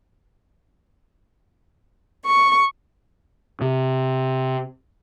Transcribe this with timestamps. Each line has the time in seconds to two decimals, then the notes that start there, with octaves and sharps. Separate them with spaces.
2.25 C#6
3.61 C3